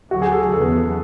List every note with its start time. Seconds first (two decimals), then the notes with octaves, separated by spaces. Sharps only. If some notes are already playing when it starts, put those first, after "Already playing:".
0.11 D2 D3 F#3 F#4
0.22 G#4
0.32 A4
0.53 E2 C#3 F#3 B3 A4